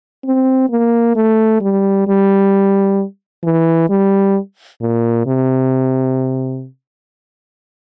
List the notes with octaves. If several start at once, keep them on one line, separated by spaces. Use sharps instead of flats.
C4
A#3
A3
G3
G3
E3
G3
A#2
C3